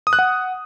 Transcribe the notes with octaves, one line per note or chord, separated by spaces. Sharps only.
D#6
F#6
F#5